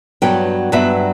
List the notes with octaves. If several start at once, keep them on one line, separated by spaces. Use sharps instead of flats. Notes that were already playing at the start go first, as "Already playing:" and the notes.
G2 F#3 B3 G5
G2 F#3 B3 E5